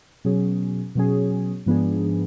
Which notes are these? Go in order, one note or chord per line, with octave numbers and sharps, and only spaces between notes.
B2 F#3 C#4 G#4
B2 F#3 C#4 G#4
G#2 F3 B3 D4 G#4